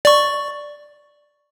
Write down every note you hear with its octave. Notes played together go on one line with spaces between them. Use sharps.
D5 C#6